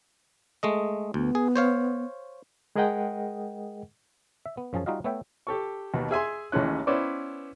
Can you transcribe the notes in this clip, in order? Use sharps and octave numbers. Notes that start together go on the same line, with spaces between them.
G#3 A3 D#5
D2 B3
G#4
C5 C#5 F5
G#3 G#4 A#4 D#5 F#5 G5
E5
B3
F#2 F3 C#4 G#4 A5
G3 D#4 F4 F#4 D#5 F5
A3 B3 A4 C#5 E5 G5
G4 A4 C#6
D#2 B2
G#4 E5 G#5 C6
A1 D#2 A2 G#3 C#4 F#6
B3 C#4 E4 B4 C5 D5